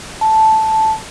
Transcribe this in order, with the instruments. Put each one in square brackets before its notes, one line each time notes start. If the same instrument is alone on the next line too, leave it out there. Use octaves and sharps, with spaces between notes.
[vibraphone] A5